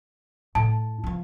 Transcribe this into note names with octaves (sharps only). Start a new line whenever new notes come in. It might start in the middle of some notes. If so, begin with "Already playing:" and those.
A2 A5
E3 F3